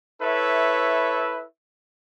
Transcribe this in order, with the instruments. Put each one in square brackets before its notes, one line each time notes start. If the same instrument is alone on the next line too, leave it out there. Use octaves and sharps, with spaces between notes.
[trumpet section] E4 A4 B4 C#5 E5